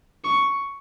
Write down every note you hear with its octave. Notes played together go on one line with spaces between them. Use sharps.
C#6